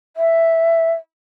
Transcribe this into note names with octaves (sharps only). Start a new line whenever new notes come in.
E5